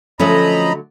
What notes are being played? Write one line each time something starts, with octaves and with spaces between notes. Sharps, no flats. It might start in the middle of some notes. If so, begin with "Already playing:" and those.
D3 F3 F#3 A3 C#4 D#5 A#5 B5